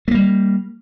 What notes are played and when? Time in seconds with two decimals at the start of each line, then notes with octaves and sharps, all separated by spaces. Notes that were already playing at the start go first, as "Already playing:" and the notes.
0.08 A3
0.11 A#3
0.14 G3